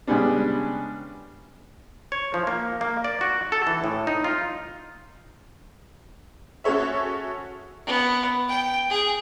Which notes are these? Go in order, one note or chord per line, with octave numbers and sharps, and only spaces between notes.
C#3 G3 G#3 B3 C#4 D4
C#5
F3
A#3
A#3
D5
F#4
A4
E3
A2
D#4
F4
C#4 F#4 G#4 A4 C#5 E5
B3
G5
G#4